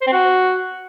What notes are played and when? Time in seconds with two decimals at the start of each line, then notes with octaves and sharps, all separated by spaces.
0.02 C5
0.07 C4
0.12 F#4